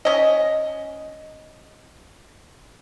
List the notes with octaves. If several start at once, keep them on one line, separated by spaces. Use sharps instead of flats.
C#4 D#5